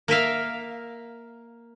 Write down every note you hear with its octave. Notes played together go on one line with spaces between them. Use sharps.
A#3 A#4 E5 F5